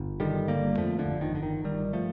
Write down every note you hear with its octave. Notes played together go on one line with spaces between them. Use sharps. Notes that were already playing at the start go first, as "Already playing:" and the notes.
Already playing: G1
D3 D#3 G3
G1 G3 A#3
F2 F3 A3
D3 F3
G1
D#3
D3
D#3
G1 D#3 G3
F3 A3